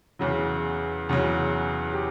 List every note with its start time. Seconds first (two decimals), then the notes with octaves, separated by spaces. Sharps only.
0.19 E2 C#3 F#3
1.09 E2 C#3 F#3
1.93 G4